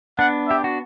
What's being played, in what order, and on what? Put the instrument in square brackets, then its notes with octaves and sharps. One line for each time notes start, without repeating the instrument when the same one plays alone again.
[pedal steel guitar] B3 D4 [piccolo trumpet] F#5
[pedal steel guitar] G4 [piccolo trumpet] E5
[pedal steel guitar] F#4